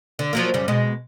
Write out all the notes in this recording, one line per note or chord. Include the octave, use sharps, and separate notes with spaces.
D3
F3 F#3 A#3
F#2 C#3 G3
B2 G#3